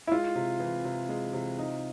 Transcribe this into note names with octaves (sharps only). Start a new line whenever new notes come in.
E4
G#3 F4
C3
E3
C3
G#3
C3
D#4